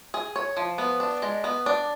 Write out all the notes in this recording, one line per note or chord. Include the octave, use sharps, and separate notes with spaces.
G#4
C#5
F3
B3
D4
G#3
B3
D4